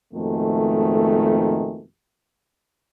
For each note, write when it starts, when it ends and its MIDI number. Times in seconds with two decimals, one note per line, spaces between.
0.13 1.84 41
0.13 1.84 44
0.13 1.84 47
0.13 1.84 51
0.13 1.84 57